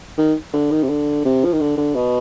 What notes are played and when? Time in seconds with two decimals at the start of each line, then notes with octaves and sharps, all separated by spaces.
0.18 D#3
0.53 D3
0.71 D#3
0.83 C3
0.89 D3
1.25 C3
1.44 F3
1.53 D#3
1.60 D3
1.77 D3
1.95 B2